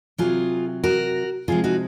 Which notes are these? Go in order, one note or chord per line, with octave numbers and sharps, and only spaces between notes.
C3 F#3 F4 G#4
F#4 A#4
C3 F3 G#3 F4 G#4
D#4 F#4